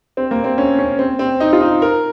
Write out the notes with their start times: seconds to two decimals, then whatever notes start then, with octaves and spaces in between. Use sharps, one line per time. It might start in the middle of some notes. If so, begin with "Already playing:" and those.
0.17 C4
0.31 A#3
0.44 C4
0.58 C#4
0.79 C#4
0.99 C4
1.19 C4
1.40 D#4
1.53 F4
1.61 D#4
1.82 A#4